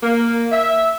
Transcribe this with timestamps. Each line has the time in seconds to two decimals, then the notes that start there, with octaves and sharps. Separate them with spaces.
0.03 A#3
0.52 E5